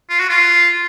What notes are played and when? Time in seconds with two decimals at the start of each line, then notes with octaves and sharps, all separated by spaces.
0.10 F4
0.19 F#4
0.29 F4